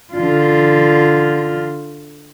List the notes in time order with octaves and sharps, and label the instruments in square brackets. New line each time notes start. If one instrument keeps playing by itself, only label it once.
[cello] D3 F4